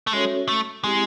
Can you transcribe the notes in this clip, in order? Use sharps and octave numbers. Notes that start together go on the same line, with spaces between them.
A3
G#3 C#4 F#4 A4 C#5 E5
A3
G#3 C4 E4 G4